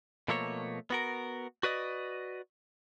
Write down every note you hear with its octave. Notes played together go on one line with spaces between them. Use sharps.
B2 F3 A3 A#3 C#5
B3 F#4 A#4
F#4 B4 D5 D#5